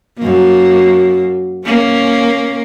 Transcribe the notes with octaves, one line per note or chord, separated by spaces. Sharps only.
F#2 A#3
A#3 C#4